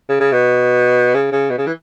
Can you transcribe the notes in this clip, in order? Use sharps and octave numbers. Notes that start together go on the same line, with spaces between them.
C#3
C#3
B2
C#3
C#3
B2
C#3
E3